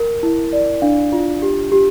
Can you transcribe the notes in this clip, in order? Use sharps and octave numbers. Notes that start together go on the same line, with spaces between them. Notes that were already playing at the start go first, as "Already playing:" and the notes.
Already playing: A#4
E4
D5
D4 F5
F4
G4
G4